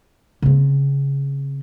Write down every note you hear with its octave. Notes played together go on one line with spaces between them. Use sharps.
C#3 C4